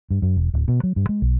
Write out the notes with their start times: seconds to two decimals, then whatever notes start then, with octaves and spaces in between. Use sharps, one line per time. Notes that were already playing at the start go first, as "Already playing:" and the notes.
0.10 G2
0.22 F#2
0.36 E1
0.54 D1
0.68 B2
0.83 F#3
0.96 G2
1.09 G#3
1.22 B1